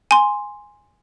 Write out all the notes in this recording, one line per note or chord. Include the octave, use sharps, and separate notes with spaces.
G#5 C6